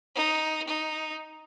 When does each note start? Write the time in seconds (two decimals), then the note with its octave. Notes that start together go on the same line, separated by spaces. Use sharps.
0.16 D#4
0.67 D#4